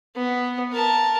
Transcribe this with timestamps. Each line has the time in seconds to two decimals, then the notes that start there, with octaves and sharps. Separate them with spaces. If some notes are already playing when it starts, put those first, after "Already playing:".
0.16 B3
0.72 A#4 A5